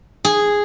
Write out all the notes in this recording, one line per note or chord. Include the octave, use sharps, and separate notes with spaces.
G#4